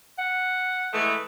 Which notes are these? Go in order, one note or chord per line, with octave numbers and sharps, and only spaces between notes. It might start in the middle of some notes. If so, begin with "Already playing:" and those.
F#5
E3 G#3 A3